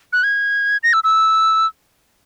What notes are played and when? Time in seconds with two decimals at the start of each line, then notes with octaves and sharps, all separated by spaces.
0.13 F#6
0.24 G#6
0.83 A#6
0.93 E6
1.04 E6